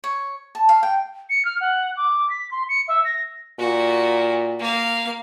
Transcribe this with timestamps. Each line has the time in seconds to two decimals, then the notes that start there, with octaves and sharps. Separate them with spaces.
0.04 C#5
0.55 A5
0.69 F5
0.83 G5
1.30 C#7
1.45 F6
1.61 F#5
1.97 D6
2.30 B6
2.51 C6
2.69 C#7
2.88 E5
3.05 A#6
3.59 A#2 F#4
4.60 A#3 F5